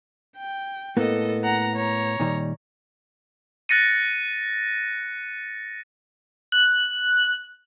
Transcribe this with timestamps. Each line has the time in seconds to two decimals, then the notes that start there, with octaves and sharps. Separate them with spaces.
0.37 G5
0.97 A2 A#3 B3 A4 D#5
1.44 F#5 A#5
1.75 C#5 A#5
2.20 A#2 D#3 G3
3.69 F#6 A6 A#6 C#7 D#7
6.52 F#6